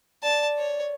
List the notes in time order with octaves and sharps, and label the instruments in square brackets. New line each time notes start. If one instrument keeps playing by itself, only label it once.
[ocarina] D5 [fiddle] A5
[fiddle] C#5